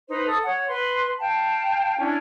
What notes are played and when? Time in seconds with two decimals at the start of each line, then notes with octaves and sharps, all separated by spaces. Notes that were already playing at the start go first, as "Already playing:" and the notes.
0.09 D#4 B4 C5
0.27 A4 D#6
0.44 C#5 F#5
0.68 B4 C6
1.20 F5 G5 A5
1.99 C#4 D4 E4